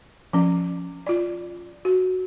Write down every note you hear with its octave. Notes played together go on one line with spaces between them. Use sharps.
F3 C#4
F4 D5
F#4